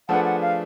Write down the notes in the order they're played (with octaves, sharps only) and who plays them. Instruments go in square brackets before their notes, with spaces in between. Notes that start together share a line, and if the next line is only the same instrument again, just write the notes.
[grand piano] F3 A3 D4 G#4 B4 [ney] F#5
[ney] F#5
F5